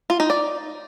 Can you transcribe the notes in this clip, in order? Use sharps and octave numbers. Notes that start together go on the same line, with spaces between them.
F4
D#4
D5